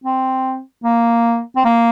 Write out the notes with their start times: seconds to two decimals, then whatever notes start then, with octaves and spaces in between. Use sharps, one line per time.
0.04 C4
0.84 A#3
1.56 C4
1.65 A#3